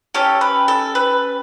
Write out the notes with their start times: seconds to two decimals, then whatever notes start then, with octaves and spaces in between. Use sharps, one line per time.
0.14 C#4 G4 A4 C#5
0.41 B4
0.68 A4
0.95 B4